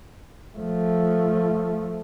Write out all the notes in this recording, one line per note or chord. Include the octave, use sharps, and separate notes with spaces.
F3 A3